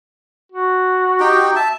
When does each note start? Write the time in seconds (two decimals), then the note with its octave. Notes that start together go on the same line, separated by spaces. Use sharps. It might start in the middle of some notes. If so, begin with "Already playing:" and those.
0.52 F#4
1.20 D#4 G4 G5
1.56 E5 A5